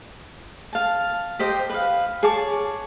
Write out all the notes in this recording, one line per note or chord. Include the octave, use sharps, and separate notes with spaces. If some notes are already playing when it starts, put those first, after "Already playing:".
F5 A5
G4 C5 D#5 G5
B4 F5
G#4 C#5 A5 D6